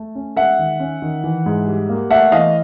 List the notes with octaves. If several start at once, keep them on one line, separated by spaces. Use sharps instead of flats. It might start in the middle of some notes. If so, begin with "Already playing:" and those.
Already playing: A3
C#4
G#3 E5 F#5
D#3
C#4
D#3
E3
G#2
G3
A#3
A3 E5 F#5
E3 D#5 F5